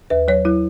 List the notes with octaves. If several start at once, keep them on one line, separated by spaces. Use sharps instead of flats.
D#2 B4
F#3 C#5
F#3 E4